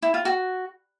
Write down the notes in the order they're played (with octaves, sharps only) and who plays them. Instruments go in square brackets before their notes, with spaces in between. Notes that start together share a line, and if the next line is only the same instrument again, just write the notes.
[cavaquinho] E4
F4
F#4